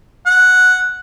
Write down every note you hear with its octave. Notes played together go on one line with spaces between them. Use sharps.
F#5